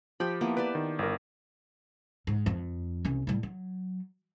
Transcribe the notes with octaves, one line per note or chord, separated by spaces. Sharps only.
F3 G4 B5
A#3 B3 E4
G4 B4 D5 A5
D#3
G1 A#4
G#2
F2
C2 C#4
A2 G3
F#3